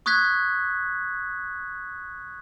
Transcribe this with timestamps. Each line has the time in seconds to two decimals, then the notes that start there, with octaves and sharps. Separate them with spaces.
0.06 C#6 D#6 F#6 G#6 B6